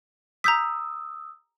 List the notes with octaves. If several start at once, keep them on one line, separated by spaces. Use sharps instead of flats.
A#5 D#6 E6 G6 B6